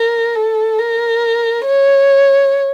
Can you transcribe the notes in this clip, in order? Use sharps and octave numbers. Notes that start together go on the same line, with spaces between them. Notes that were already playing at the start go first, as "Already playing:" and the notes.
Already playing: A#4
A4
A#4
C#5